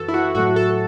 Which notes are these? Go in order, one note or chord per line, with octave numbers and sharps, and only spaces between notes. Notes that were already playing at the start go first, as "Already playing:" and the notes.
Already playing: F#2 E3 F#4 A4 B4
E4
F#4
A2 F#3 A3 F#4
A4